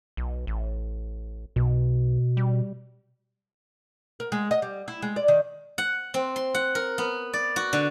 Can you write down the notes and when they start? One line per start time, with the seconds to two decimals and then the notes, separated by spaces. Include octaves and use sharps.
0.17 B1
0.47 A1
1.56 B1 B2
2.37 G3
4.20 A#4
4.32 G#3
4.51 D#5
4.62 G3
4.88 E4
5.02 G#3
5.16 D5
5.28 D#3
5.78 F#5
6.14 C4
6.36 C6
6.55 F#5
6.75 A#4
6.98 B3
7.33 D5
7.56 F#4
7.73 D3